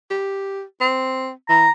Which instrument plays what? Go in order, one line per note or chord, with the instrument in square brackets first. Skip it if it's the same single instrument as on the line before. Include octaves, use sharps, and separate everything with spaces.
[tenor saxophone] G4
C4
[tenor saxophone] E3 [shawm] A#5